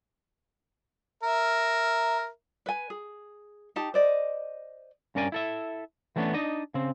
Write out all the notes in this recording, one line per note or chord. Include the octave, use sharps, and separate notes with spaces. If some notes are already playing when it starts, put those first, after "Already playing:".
A#4 E5
B4 G#5
G#4
D#4 G4 A5
C5 D5 D#5
G2 C#4 A#4 D5 G#5
E4 A4 E5
E3 G3 A3 B3 C#4 D4
D4 D#4 D#5
C#3 C4